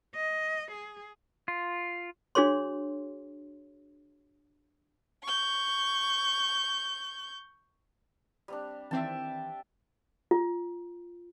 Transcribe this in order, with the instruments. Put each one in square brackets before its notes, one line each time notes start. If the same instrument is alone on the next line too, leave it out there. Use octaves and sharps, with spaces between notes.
[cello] D#5
G#4
[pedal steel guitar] F4
[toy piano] D4 F#4 G#4 C#5 C6
[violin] C#6 G6
[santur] G3 C4 D4
[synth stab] D#3 E3 C4 [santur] E5 G5 A5
[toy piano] F4